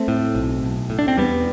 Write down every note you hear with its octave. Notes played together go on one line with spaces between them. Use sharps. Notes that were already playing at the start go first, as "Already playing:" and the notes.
Already playing: A3 C4
A2
B1
B1
A2
D4
C4
E2 G3 B3